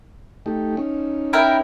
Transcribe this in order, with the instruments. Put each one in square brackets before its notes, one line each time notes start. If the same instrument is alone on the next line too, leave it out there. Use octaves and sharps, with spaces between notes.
[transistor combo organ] A3 D#4 G4
C#4 D#4
[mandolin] E4 A#4 G5